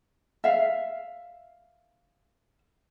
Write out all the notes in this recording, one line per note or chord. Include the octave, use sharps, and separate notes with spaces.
E5 F5